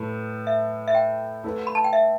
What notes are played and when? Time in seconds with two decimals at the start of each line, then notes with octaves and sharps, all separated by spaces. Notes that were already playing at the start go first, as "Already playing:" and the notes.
Already playing: A2 A3 B4
0.47 E5
0.88 E5
0.95 G5
1.44 A3 E4 B4
1.67 B5
1.75 A5
1.84 G5
1.93 E5